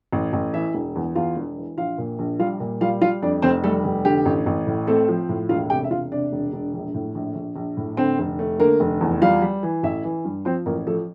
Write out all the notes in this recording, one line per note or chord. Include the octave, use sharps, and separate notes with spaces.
A1
A1
E3 E4 E5
E1
E2
E2 F4 F5
E1
E3
A#1 F4 F5
A#2
A#1
G3 F4 F5
A#2
G3 F4 F5
G3 F4 F5
F2 D4 D5
F1 C4 C5
G3 A3 A4
F1
D3 G4
A1
A1
A2
A3 C4 A4
F3
A2
E1 F4 F5
C3 G4 G5
E5
E1 F4 F5
C3 D4 D5
E1
E1
A#1
A2
A#1
A#1
A#1
A2
D3 C4 C5
F1
A3
D3 A#3 A#4
F1
E2
G3 F4 F5
G3
E3
A1 E4 E5
E3
G2
F3 C4 C5
A1 A#3 A#4
F3 A3 A4